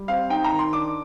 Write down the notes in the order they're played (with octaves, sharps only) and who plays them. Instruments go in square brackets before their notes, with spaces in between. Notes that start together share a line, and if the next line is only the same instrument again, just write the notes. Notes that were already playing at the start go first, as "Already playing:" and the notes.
Already playing: [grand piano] G3
C4 F5
D#4 G5
A#5
D#3
C6
D4 D6